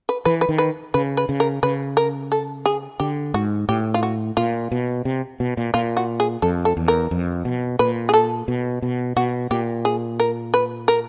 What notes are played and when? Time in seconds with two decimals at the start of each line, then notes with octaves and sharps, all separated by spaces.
0.09 B4
0.25 E3 B4
0.41 B4
0.49 D#3
0.58 B4
0.94 C#3 B4
1.17 B4
1.29 C#3
1.40 A#4
1.63 C#3 B4
1.97 A#4
2.32 A4
2.66 G#4
3.00 D3 G4
3.34 G#2 F#4
3.69 A2 G4
3.94 F4
4.03 F#4
4.37 A#2 F4
4.72 B2
5.05 C3
5.40 B2
5.57 A#2
5.74 A#2 F4
5.97 F#4
6.20 G#4
6.42 F2 A4
6.65 A4
6.77 E2
6.88 A#4
7.11 F2
7.45 B2
7.79 A#2 B4
8.09 G#4
8.14 A4
8.48 B2
8.82 B2
9.16 B2 F#4
9.51 A#2 G4
9.85 G#4
10.20 A#4
10.54 B4
10.88 A#4